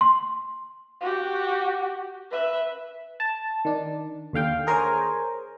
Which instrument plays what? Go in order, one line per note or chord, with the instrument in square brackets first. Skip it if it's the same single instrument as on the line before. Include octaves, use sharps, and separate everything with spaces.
[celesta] C6
[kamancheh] F#4 G4
B4 E5
[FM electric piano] A5
D#3 D4
D#2 D3 F5 G5
G#4 A#4 C5 C#5 G#5